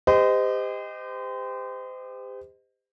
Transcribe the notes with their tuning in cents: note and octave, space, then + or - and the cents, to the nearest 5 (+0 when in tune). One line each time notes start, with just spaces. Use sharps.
G4 +30 C5 -35 D#5 +0